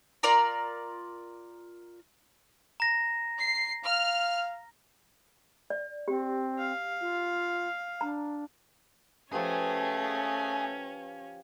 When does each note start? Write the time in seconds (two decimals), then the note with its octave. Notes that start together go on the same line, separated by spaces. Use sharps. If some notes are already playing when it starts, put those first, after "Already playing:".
0.23 F4 A#4 D5 A#5
2.80 A#5 A#6
3.39 C7
3.84 F5 F6
5.70 D5
6.08 C4 G4
6.58 F5
7.00 F4
8.01 D4 A#5
9.33 F3 A3 C#4 G4 G#4 B4